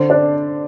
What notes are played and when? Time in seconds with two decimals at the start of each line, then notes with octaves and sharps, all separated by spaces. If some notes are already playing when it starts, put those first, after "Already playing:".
Already playing: D3 C5
0.10 D4 D5